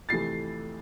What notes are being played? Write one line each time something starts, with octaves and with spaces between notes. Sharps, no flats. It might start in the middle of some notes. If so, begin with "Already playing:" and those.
F2 C3 E3 A3 A6 C7